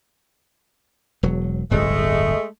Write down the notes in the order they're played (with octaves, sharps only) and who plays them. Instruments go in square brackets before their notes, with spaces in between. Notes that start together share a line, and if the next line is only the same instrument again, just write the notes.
[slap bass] E1 F#3
[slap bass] D1 G1 F2 [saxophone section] G#3 A3